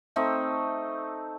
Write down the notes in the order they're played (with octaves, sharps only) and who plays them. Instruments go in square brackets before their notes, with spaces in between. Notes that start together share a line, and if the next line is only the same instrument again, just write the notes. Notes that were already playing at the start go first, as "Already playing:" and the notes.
[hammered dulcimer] A3 C4 D#4 E5